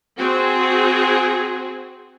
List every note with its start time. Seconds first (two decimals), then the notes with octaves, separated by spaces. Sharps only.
0.17 C4 F#4 G#4